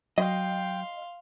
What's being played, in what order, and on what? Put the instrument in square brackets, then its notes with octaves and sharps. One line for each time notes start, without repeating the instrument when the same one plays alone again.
[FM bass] F#3 [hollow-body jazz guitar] D#5 [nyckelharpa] F5 C6 [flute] G5